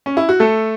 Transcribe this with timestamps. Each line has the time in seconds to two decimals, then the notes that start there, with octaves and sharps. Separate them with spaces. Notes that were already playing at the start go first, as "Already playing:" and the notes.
0.06 C#4
0.17 E4
0.29 F#4
0.40 A3 A4